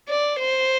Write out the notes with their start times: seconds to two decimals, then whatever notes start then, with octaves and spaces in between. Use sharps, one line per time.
0.09 D5
0.39 C5